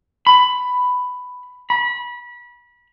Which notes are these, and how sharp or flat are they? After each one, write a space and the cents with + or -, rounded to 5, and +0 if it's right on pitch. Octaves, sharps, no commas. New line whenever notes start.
B5 +10
B5 -30